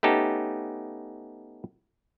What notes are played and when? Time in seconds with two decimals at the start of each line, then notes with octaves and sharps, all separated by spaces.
0.03 A3 B3 C#4 D#4 G4 A5